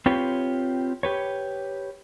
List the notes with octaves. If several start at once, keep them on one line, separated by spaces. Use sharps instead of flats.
C4 F4 G4 B4 C#5
G4 B4 C#5